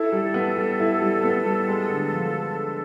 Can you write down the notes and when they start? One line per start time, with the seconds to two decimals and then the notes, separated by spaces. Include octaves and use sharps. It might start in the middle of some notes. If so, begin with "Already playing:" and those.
Already playing: E4 A4
0.12 G3
0.34 B3
0.57 G3
0.80 E4
1.01 G3
1.23 B3
1.45 G3
1.68 G#3
1.89 D3
2.13 F3